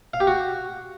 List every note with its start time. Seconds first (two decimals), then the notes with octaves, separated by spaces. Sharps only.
0.14 F5
0.20 G4
0.27 F#4